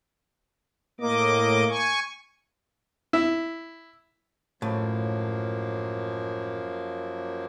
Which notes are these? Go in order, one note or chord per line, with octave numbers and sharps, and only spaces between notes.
A2 A#3 D#5 D6
G#5 C#6
E4
F#2 A2 F3 A#3